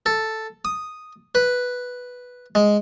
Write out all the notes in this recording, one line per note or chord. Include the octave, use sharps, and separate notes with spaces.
A4
D#6
B4
G#3